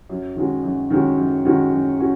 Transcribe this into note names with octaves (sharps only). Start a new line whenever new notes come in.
F#2
D#3 G#3 C#4 F#4
F#2
D#3 G#3 C#4 F#4
F#2
D#3 G#3 C#4 F#4
F#2
C#4 F#4